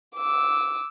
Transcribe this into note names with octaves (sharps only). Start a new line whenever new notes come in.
D6 E6